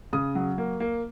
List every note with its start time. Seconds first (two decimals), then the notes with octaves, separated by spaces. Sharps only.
0.13 C#3 D#6
0.35 F#3
0.58 A#3
0.80 A#3